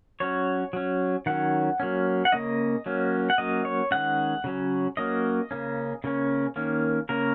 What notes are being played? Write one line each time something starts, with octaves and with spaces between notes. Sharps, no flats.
F#3 C#4 C#5
F#3 C#4
D#3 F#3 C#4 F#5
F#3 A#3 C#4
F#5
C#3 A#3 C#4 D#5
F#3 A#3 C#4
F#5
F#3 A#3 C#4 D#5
C#5
D#3 G#3 C#4 F#5
C#3 F#3 C#4
F#3 A#3 C#4 D#5
C#3 A#3 C#4
C#3 A#3 C#4
D#3 A#3 C#4
C#3 A#3 C#4 A#4